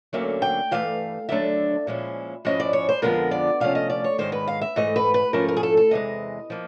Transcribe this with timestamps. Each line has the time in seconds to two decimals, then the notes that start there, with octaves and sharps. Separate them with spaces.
0.13 D2 D3 F#3 A#3 C#4 E5
0.42 G5
0.71 G2 E3 A3 F5
1.29 D#2 D3 F#3 A3 D4 E5
1.87 A#2 F3 G#3 C#4 E4
2.45 G#2 F3 G#3 C#4 E4 D#5
2.60 D5
2.73 C#5
2.89 C5
3.02 F2 D3 F3 G#3 B3 A#4
3.31 D5
3.60 C3 F3 A3 C#4 F5
3.75 D#5
3.90 D5
4.04 C#5
4.18 G#2 D#3 G#3 C5
4.32 B4
4.48 F5
4.61 E5
4.76 G#2 E3 A3 D#5
4.96 B4
5.14 B4
5.33 G#2 F3 A3 C#4 E4 A#4
5.49 A#4
5.57 G#4
5.63 A4
5.77 A4
5.91 E2 C3 E3 G#3 D#5
6.50 F3 A#3